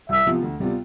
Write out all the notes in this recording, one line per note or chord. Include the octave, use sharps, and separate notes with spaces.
C2 E5
C3 F3 B3 F4
D2
C3 G3 B3 F4